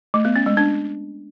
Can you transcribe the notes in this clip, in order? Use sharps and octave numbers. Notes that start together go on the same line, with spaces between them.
A3
B3
C#4
G#3
D4